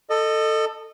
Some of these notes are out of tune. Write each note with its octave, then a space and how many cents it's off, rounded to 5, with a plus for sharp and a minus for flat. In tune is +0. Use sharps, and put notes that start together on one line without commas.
A4 +15 D#5 -20